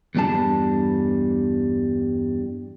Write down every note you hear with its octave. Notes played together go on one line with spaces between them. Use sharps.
E2 G2 G3 D4 A5